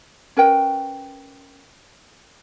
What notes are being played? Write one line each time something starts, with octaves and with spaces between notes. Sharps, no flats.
C#4 A#4 B4 G5